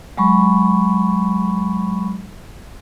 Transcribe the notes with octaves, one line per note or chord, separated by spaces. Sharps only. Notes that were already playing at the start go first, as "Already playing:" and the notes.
F#3 G#3 B5 C#6